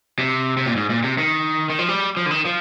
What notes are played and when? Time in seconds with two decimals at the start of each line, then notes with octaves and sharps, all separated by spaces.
0.19 C3
0.57 C3
0.66 A#2
0.76 G#2
0.90 A#2
1.04 C3
1.18 D#3
1.70 D#3
1.79 F3
1.89 G3
2.17 F3
2.26 D3
2.31 D#3
2.45 F3